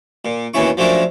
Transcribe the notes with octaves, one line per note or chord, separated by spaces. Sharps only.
A#2
D#2 B2 E3 C#4 E4 C#6
F3 F#3 A3 C#4 D4 A#4